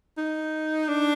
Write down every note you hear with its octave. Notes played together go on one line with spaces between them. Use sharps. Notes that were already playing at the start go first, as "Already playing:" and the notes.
D#4
D4